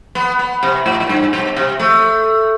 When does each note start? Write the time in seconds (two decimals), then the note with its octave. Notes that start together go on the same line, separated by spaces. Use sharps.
0.15 B3
0.39 B3
0.63 C3
0.86 A2
1.00 A2
1.09 G2
1.33 B2
1.57 C3
1.80 A3